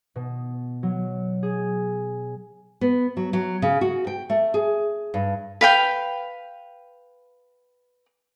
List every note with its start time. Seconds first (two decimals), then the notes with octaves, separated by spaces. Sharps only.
0.16 B2
0.83 F#3
1.43 G#4
2.81 B3
3.17 F#3
3.33 F#3
3.62 C#3
3.81 F#4
4.07 G5
4.30 A3
4.54 G#4
5.14 G2
5.61 B4 F5 G5